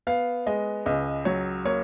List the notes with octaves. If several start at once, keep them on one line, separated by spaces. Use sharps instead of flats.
B3 F5
G#3 D#5
C#2 D#5
F#3 C#5
A#3 C#5